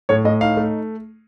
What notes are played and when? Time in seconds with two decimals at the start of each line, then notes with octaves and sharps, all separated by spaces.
0.09 A2 C#5
0.25 A2 D#5
0.41 D#4 F5
0.57 A3